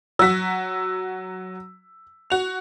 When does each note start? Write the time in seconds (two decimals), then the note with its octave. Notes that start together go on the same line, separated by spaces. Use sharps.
0.19 F#3 F#4 E6 B6
2.30 F#4 F7